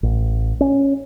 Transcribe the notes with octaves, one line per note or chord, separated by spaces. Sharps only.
A1
C#4